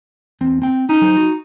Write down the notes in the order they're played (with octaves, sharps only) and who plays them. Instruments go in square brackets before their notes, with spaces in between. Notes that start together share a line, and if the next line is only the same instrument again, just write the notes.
[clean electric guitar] E2 C4
C4 G5
[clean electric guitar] C#4 [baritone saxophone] D#4
[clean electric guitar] F#3 C5
F#4